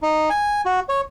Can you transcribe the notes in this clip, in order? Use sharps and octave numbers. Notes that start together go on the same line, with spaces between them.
D#4
G#5
F#4
C#5